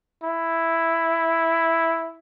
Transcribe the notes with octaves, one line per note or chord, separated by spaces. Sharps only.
E4